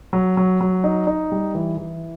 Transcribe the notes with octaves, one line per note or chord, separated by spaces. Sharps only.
F#3
F#3
F#3
D#4
D#4
G3
E3
E3